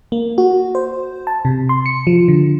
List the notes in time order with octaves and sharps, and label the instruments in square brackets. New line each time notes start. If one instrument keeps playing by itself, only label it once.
[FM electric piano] A#3
F#4
C5
A5
C3
C6
C#7
F3
D3